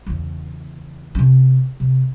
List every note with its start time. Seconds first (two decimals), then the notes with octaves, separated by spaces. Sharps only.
0.06 E2 C#3
1.15 C3 C#4
1.80 C3